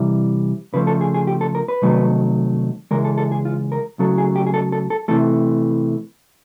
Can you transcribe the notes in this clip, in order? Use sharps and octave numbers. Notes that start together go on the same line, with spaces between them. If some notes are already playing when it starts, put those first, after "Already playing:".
Already playing: C3 E3 G3
C#3 F3 A3 B4
A4
G#4
G#4
G4
A4
A#4
B4
C3 D#3 F#3 A3
C#3 E3 G#3 A#4
A4
A4
G#4
F4
A#4
C#3 F#3 A3 A4
G#4
G4
G#4
A4
A4
A4
C3 E3 A3 A4